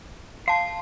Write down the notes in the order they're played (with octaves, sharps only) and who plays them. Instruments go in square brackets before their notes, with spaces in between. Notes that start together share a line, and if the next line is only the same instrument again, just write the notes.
[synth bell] F5 A5 [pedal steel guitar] C6